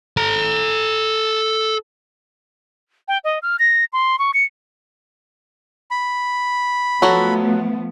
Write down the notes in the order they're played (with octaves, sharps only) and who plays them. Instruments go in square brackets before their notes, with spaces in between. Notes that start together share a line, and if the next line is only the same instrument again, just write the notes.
[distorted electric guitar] A4 A#5
[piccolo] G5
D#5
F6
A#6
C6
C#6
C#7
[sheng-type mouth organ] B5
[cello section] F3 A3 B3 [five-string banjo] F#3 F#4 A4